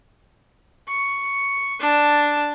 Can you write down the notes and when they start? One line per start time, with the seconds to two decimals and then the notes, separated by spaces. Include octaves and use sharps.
0.88 C#6
1.80 D4 A5